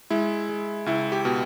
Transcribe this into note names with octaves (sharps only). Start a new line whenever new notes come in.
G#3 E4
G#3
C#2 E4
G4
B2